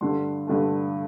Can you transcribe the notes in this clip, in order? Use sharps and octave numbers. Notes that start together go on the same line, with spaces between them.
G2 D3 A3 C6
G2 D3 A3